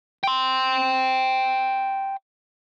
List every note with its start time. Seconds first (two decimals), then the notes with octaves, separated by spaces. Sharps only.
0.24 G5 C6